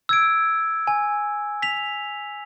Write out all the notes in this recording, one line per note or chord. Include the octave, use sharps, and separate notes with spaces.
E6 G#6 D7
G#5
B6 F7